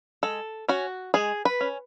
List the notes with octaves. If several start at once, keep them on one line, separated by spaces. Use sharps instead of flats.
G#3 A4
C#4 F#4
G#3 G#4
B4
C#4